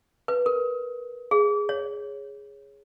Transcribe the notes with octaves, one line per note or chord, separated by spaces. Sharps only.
B4
A#4
G#4
C#5